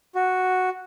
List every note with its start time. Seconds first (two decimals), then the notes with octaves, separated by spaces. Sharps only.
0.15 F#4